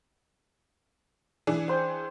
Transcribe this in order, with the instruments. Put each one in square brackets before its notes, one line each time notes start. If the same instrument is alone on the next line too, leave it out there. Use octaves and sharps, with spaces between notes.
[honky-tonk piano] E3 D4 G#4
[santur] C5 G5